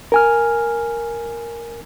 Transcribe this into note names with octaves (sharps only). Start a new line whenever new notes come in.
A#4 G#5 F6